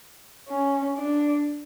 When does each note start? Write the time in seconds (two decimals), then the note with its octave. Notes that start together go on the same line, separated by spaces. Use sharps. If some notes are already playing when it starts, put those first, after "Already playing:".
0.48 C#4
0.97 D4